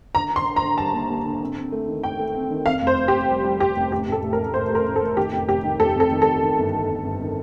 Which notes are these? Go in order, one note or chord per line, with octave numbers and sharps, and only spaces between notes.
D3 A#5
D3 C6
D3
A#5
D3
G3 A5
D#2
D#2
D3
C4
C4
A3
D#3
A3 G5
A3
C4
D#3
F2 F5
F1
C5
F1
G4
F2
G3
G3
G3 G4
F1
A1 G4
A1
A4
A2
A#4
A1
A2 C5
A3
A#4
A1
A4
A2
D#3 G4
F1
F1 G4
D#3
F1 A4
F2 A4
D#3
A4
F2
D#3
G1
D#3
G1
G1
D#3